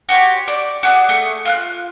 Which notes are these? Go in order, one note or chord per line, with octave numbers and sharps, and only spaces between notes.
F#4 G4 C#5 C6
D5
F#4 G#4 D5
A3 G#4
F4 F6 F#6